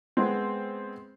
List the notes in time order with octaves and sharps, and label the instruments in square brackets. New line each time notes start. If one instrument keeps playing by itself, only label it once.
[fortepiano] G#3 B3 C4